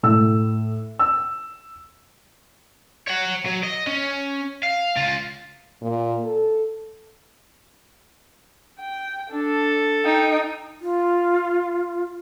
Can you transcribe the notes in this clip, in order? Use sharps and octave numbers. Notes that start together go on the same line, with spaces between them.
A2 E6
E6
C#5 F#5
F#3
D#5
C#4
F5
C#2 F4
A#2
A4
G5
D4 A4
D#4 G5
F4